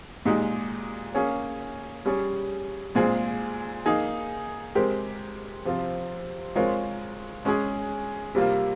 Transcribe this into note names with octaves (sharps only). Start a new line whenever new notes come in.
A#2 G#3 D#4 G4
A#3 C#4 G#4 C#5
G3 C#4 G#4 C#5
A#2 G#3 C4 F4 G#4
A#3 D#4 G#4
G#3 C4 G4 A#4
C3 F3 C4 F4
G#3 C4 F4 A#4 C#5
G#3 C#4 G#4
C3 G3 A#3 F4